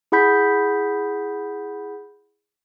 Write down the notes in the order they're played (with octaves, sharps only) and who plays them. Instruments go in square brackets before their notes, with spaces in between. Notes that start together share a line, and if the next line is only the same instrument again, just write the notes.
[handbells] E4 G#4 F#5 B5 G6 B6